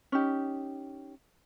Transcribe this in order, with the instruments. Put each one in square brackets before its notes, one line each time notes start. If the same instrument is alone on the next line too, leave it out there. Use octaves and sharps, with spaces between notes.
[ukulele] C#4 D#4 G4